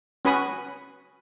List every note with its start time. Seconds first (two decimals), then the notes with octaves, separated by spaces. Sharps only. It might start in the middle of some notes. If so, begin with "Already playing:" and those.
0.25 C#4 F#4 B4 G#5 B5 D#6